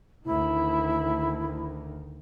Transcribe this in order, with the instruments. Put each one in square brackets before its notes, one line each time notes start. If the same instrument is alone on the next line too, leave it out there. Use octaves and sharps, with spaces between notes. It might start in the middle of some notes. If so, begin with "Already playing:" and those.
[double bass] D2 D#3 [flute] E4